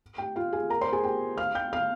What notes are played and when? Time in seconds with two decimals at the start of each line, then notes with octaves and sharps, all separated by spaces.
0.18 G4 G5
0.36 F4 F5
0.52 G#4 G#5
0.70 A#4 A#5
0.81 C5 C6
0.93 G#4 G#5
1.03 G4 G5
1.38 F5 F6
1.55 G5 G6
1.73 F5 F6